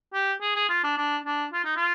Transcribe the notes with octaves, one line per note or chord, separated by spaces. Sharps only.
G4
G#4
G#4
F4
D4
D4
D4
F4
D#4
F4